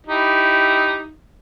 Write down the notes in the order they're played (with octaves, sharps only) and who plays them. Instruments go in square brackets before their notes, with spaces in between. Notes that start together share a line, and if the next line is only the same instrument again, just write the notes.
[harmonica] D#4 E4 G4